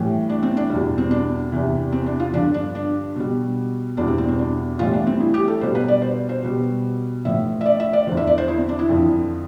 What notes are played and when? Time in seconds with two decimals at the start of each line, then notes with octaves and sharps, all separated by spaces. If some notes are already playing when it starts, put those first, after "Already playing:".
Already playing: A2 E3 G3
0.29 D4
0.43 C4
0.57 D4
0.70 E2 B2 G3
0.98 C4
1.11 D4
1.52 E2 C3 E3
1.92 C4
2.06 D4
2.20 F4
2.33 G2 D3 F3 D4
2.54 D4
2.75 D4
3.16 B2 G3
3.97 E2 B2 G3 D4
4.08 C4
4.18 C4
4.28 C4
4.39 D4
4.79 A2 E3 G3 F4
4.93 D4
5.07 C4
5.20 E4
5.34 G4
5.48 A4
5.61 B2 G3 C5
5.75 B4
5.88 D5
6.02 C5
6.29 C5
6.43 B2 G3
7.25 A2 F3 E5
7.61 E5
7.66 D5
7.80 E5
7.93 D5
8.07 E2 D3 F3 C5
8.17 E5
8.27 D5
8.38 C5
8.48 E4
8.58 C4
8.69 D4
8.79 E4
8.89 F2 D3 F3